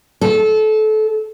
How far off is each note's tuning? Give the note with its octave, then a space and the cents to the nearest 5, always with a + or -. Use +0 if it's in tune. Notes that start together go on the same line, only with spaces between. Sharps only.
A4 -25